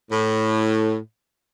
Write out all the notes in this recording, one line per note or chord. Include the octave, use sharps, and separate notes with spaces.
A2